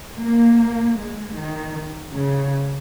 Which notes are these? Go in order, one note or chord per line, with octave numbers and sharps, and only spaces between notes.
A#3
G#3
D#3
C#3